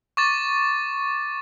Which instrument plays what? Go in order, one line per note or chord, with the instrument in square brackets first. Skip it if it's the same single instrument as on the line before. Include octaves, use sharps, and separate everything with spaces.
[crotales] C#6 D6 A6